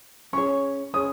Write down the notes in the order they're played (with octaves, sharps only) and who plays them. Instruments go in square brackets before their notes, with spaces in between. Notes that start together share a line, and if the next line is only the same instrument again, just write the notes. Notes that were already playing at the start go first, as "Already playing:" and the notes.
[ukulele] C#4 G#4 C#5 [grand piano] C#6
[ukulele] C#4 G#4 C#5 [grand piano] D#6